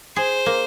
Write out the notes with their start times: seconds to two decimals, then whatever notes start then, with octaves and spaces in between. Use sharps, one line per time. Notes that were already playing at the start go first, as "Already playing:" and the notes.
0.16 G#4 C5
0.46 A#3